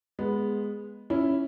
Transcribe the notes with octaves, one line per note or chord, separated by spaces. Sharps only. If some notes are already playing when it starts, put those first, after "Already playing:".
G#3 B3
C#4 E4